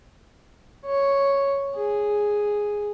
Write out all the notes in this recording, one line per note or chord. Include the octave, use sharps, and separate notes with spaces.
C#5
G#4